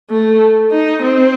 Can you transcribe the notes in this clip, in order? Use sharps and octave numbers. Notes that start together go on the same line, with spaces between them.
A3
D#4
C4